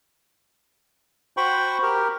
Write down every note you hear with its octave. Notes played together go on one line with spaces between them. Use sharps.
F#4 C5 G5 B5 C#6
G4 A#4